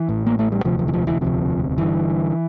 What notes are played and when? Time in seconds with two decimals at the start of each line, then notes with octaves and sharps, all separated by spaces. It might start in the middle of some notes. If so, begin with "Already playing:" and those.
Already playing: E3
0.09 A1 A2
0.26 A#3
0.39 A3
0.52 G3
0.65 E1 D2 C3 F3
0.79 F3
0.88 E3
0.93 F3
1.07 E3
1.21 E1 D2 C3 F3
1.78 G1 G2 D3 E3